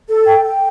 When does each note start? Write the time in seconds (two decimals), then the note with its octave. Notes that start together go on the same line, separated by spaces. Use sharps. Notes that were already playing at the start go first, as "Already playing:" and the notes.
0.08 A4
0.26 G5
0.44 G5